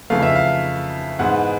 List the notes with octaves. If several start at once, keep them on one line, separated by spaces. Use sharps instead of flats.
F2 C#3 E3 A3 F5
E5
F5
G#2 E3 G#3 B3 F#5